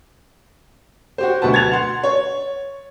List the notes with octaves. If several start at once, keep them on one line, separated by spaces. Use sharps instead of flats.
F#4 G4 C5
D2 B2 F#3 F#4 B4 A5
G#6 A6 F7
F#5 C6
C#5